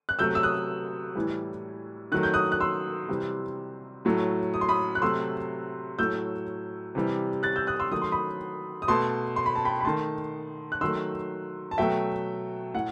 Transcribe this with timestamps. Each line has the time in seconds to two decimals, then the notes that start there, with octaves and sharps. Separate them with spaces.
0.09 F#6
0.19 C3 F#3 A3 E6 G6
0.35 E6
0.43 D#6 F#6
1.15 A2 E3 G3
2.12 D#3 F#3 A3 F#6
2.23 G6
2.34 D#6 F#6
2.52 F#6
2.60 C6 E6
3.09 C3 E3 G3
4.05 A2 F#3 A3
4.54 D#6
4.61 C6
4.69 B5 D#6
4.95 F#6
5.02 C3 F#3 A3 C6 E6
5.99 A2 F#3 A3 E6 G6
6.95 C3 E3 G3
7.43 F#6 A6
7.56 E6 G6
7.67 D#6 F#6
7.80 C6 E6
7.91 D#3 F#3 A3 D#6
8.02 C6
8.12 B5 D#6
8.82 D#6
8.88 B2 A3 A5 C6
9.36 C6
9.46 B5
9.55 A5
9.65 G5 B5
9.80 B5
9.85 D#3 A3 A5 C6
10.72 F#6
10.81 D#3 F#3 A3 C6 E6
11.71 A5
11.78 B2 F#3 A3 E5 G5
12.74 A2 F#5